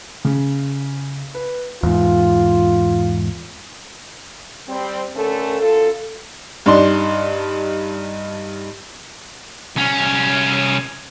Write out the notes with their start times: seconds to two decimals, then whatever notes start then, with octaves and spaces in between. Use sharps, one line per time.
0.25 C#3
1.34 B4
1.83 E2 G#2 F4
4.69 G3 C4
5.15 D3 A3 C#4 A4 A#4
5.60 F#2 F4 A4
6.66 G2 D4 D#4 C6
9.76 C2 C#4